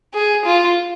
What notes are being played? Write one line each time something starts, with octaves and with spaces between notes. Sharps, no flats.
G#4
F4